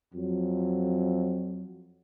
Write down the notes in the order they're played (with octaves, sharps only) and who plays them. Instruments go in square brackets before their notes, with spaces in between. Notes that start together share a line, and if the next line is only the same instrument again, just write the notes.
[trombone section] F2 F#3